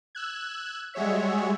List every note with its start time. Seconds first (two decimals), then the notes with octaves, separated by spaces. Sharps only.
0.15 E6 F#6 G#6
0.94 G3 G#3 F#4 C#5 E5